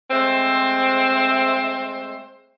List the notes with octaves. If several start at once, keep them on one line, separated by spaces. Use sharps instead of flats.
G#3 A3 C4 C5